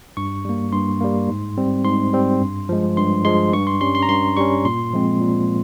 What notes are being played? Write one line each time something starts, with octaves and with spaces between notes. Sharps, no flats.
G2 C#6
G3 A#3
G2 C6
G3 A#3
G#2
G3 C4
G#2 C6
G3 C4
G2
F3 G#3
G2 C6
F3 G#3 C6
G2 C#6
C6
G3 C#4 C6
C6
A#5
G2 C6
G3 C#4 C#6
A#2 C6
F3 G#3 C4
A#2